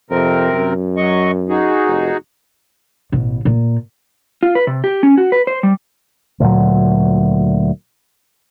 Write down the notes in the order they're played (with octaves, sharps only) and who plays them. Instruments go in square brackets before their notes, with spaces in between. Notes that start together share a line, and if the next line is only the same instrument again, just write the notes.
[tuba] F2 [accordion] C3 C4 A#4
[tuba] F#2
[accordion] F#3 D#5 C#6
D#4 F#4 G#4
[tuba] F1
[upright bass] A1 B2
A#2
[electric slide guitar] F4
B4
C3
G4
C#4
F#4
B4
C5
G3
[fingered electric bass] D2 A#2 F#3